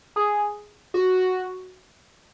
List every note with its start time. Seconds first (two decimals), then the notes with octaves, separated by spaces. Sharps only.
0.16 G#4
0.94 F#4